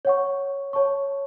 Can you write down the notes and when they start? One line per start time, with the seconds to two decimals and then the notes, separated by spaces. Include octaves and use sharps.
0.05 C#5 F#5 C#6
0.73 C#5 A5 C#6